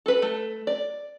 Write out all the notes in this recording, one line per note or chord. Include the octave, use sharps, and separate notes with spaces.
A4 B4
A3
D5